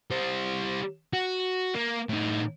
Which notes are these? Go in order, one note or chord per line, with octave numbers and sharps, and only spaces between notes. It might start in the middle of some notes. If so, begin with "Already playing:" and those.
G3 C5
F#4
A#3
A2 D#4